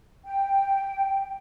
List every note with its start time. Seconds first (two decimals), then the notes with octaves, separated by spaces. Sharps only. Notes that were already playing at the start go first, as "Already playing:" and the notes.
0.24 G5